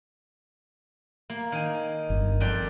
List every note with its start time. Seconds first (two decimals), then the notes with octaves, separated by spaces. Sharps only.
1.30 A#3
1.52 D#3 G#5
2.10 G1
2.40 F2 D5 G5